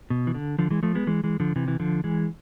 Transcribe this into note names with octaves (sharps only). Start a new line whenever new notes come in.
B2
E3
D3
D3 F3
E3 G#3
F3 A3
G#3 B3
E3 G#3
E3 G#3
D3 F3
C3 E3
E3
D3 F3
E3 G#3